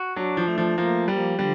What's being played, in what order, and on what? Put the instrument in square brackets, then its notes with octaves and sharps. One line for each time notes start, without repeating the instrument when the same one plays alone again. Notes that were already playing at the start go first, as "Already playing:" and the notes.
Already playing: [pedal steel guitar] F#4
[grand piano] F#3 [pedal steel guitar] D4
[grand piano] F3
[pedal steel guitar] A3
[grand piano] F3
[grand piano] F3 [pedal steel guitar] A#3
[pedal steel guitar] F3 [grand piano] G3
[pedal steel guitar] D3 [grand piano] G3